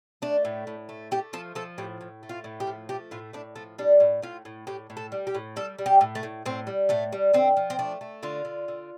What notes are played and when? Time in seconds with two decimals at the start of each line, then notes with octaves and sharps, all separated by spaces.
0.22 A3 D4
0.45 A2
0.67 A2
0.89 A3
1.11 A3 G4
1.33 F3 A4
1.55 F3 A4
1.78 A2 G4
2.01 A2
2.23 A3
2.29 F4
2.44 A2
2.60 G4
2.67 F3
2.89 A3 G4
3.11 A2 F4
3.33 A2 D4
3.56 F3 A3
3.78 G3 D4
4.00 A2
4.22 A2 F4
4.45 A2
4.67 A2 G4
4.90 A2
4.97 A4
5.12 G3
5.27 G4
5.35 A2
5.56 G3 A4
5.78 G3
5.86 G4
6.01 A2
6.15 A3
6.23 A2
6.46 A2 C4
6.67 G3
6.89 A2 A3
7.12 G3
7.34 D3 C4
7.57 F3
7.70 C4
7.79 A3 D4
8.01 A3
8.23 D3 F4
8.45 D3
8.68 D3